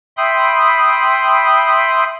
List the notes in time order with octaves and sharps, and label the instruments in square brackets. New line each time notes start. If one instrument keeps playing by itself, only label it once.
[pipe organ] E5 G5 B5 C6 D#6